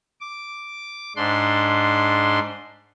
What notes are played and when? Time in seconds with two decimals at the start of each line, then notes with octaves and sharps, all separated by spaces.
0.21 D6
1.16 G#2 D4 C6